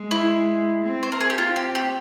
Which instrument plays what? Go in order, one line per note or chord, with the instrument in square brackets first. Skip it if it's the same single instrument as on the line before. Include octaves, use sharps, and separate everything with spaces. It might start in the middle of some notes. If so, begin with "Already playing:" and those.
Already playing: [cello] G#3
[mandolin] E4
[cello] C4
[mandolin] C5
A#4
G#4
G4
[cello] C4 [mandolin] F4
[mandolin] G4
G4